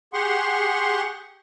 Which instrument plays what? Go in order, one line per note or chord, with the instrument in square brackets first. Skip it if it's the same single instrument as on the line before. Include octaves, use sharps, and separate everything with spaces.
[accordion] G4 G#4 F#5 C6 C#6